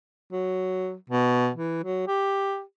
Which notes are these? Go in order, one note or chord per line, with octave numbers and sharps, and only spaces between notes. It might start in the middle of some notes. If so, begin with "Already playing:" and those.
F#3
B2
E3
F#3
G4